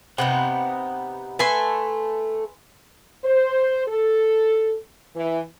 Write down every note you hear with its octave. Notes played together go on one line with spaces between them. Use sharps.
C3 B3 D#4 F#5 G5
A3 A4 B4 G#5 C6
C5
A4
E3